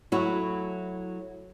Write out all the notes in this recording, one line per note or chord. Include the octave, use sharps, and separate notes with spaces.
F#3 A3 E4 F#4